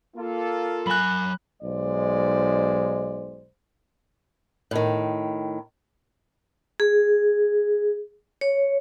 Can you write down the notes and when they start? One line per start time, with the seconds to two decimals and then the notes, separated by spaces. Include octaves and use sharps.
0.17 A#3 F4 A4
0.87 F#3 G#5 B5 F#6
1.62 B1 G#2 G#3 C5 D5
4.71 A2 D#3
6.80 G#4
8.41 C#5